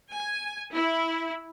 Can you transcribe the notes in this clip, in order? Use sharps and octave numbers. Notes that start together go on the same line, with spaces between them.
G#5
E4